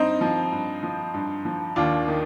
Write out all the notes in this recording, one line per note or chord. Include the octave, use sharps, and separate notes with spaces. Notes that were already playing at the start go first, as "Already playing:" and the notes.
Already playing: G2 C4 D#4
F3
G2
F3
G2
F3
D#2 D4 F4
D#3